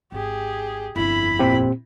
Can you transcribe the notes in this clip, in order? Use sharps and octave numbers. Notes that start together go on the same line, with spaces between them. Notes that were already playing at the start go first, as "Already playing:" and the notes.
G#1 G4 G#4
G1 F2 E4 B5
A#2 C4 G4